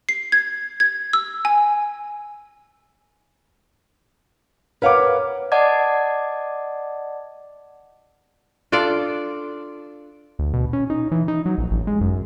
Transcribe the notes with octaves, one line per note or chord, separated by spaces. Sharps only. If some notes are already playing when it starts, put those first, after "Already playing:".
C7
G#6
G#6
E6
G#5
A#4 B4 C#5 F5 F#5 D6
D5 D#5 F#5 A5 D6 G#6
D4 F4 A4 D5
D2
B2
C#4
D#4
E3
D#4
F#3
A#1
A1
G#3
F#2